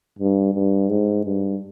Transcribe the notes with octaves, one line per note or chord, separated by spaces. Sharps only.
G2
G2
G#2
G2